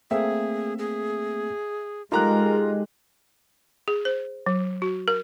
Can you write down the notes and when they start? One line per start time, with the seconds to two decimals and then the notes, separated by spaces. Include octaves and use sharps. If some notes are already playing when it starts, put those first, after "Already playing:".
0.11 A3 A#3 C4 G#4 E5
0.79 G#4
2.12 G#3 D#4 F4 G4 A4 A#4 A#5 F#6
3.88 G#4
4.05 C5
4.46 F#3
4.82 F#4
5.08 A#4